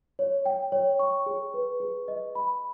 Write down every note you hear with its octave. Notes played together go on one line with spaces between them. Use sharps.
C#5
G5
C#5
C#6
G#4
B4
G#4
D#5
B5